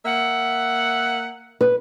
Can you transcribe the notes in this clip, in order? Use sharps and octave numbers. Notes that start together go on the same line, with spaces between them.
A#3 E5 F#5
B4